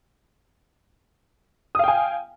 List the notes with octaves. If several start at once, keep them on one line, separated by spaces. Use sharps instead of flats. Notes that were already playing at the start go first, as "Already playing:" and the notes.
F5 G5 G#5 D#6